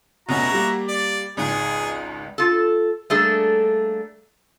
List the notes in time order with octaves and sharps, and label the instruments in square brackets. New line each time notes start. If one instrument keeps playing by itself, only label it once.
[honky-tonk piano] F1 B2 C#4 [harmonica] E4 F#4 A#5
[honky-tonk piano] G3 A#3
[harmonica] D5
[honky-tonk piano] G#1 C#2 G#2 [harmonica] G#4
[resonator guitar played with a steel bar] F4 A4
G3 A3 A#3 D4 G#4 A4